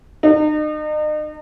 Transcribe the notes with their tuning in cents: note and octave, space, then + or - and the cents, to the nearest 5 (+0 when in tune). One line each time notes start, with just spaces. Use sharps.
D#4 -40